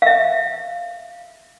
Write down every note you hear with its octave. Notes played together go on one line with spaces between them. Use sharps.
E5 F5